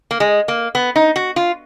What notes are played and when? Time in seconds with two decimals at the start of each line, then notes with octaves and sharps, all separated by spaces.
0.11 A#3
0.20 G#3
0.48 A#3
0.75 B3
0.96 D#4
1.16 F#4
1.36 F4